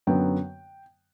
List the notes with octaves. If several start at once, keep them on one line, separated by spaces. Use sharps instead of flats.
F#2 D3 F#3 B3 G5